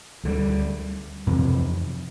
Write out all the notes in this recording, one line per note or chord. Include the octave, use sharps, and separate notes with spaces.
D2 D3 G3
F2 C3 E3